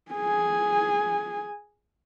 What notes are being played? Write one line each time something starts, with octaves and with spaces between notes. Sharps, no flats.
G#4 G#5